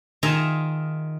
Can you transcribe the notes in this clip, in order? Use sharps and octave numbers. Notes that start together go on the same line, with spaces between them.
D#3 F4 G#4 E5 A#5